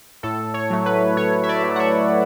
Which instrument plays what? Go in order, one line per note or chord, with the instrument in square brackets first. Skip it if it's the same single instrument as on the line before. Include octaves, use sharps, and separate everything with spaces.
[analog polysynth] A2 A4
C#5
F#3 A3
B4
A2 C#5
E5
D5
F#3 A3
F#5
E5